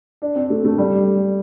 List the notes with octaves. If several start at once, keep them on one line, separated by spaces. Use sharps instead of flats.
D4
C4
A3
A3
G3